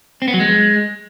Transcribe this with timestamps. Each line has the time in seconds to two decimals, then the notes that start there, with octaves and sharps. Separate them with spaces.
0.22 C4
0.28 B3
0.34 F#3
0.40 G#3